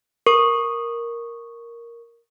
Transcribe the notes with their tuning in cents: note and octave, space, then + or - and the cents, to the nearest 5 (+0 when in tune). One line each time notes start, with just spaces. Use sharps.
A#4 +0 C#6 +0